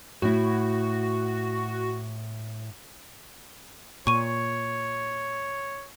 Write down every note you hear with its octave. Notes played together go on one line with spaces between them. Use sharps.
A2 E4 F#4
A#2 C#5 C#6 D#7